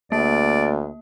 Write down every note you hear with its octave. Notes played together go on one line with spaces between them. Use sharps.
D2 A#3 D5